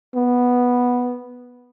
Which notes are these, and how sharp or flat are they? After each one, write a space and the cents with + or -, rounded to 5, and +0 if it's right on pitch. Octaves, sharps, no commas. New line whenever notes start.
B3 -5